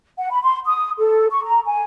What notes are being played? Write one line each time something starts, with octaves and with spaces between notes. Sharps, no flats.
F#5
B5
C6
D#6
A4
C#6
A#5
G#5